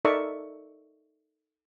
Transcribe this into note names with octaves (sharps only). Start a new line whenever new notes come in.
D#4 A4 A#4 D5 E5 C#6